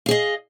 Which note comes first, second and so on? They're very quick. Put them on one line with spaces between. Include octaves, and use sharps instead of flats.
F5 G#4 D#5